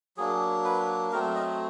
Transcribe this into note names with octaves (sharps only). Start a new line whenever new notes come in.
F#3 A#3 D4 G#4
B4
F#3 A3 C4 A#4
D#5